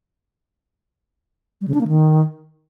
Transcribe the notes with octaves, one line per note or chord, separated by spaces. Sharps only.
G3
C#3
D4
A#3
D#3